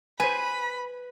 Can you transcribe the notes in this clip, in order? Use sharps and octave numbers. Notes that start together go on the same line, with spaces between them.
B4 C5 G#5 B5